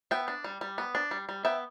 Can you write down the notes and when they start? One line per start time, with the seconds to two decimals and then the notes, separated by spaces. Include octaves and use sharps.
0.11 B3 E5 G5
0.28 D4
0.44 G3
0.61 G3
0.78 B3
0.95 D4
1.11 G3
1.29 G3
1.45 B3 E5 G5